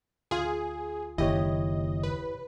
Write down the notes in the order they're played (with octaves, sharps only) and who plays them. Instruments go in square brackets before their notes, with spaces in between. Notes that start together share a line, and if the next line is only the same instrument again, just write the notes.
[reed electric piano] D2 F4 [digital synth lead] G#4
[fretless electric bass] F#1 D#2 [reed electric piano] E4 G4 C#5 [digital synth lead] D#5
[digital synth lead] B4